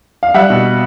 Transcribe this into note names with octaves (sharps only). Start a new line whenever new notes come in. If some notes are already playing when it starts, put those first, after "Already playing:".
F5
G3 E5 F#5
B2